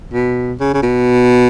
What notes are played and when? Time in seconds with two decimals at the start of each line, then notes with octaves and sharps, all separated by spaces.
0.13 B2
0.60 C#3
0.74 C#3
0.83 B2